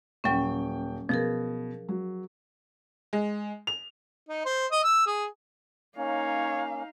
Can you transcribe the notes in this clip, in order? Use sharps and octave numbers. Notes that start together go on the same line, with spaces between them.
D#1 F#3 C#4 G5
B2 F3 G#4 A#4
F#3
G#3
F7
D#4
C5
D#5
E6
G#4
A#3 C#4 D#4 C#5 F5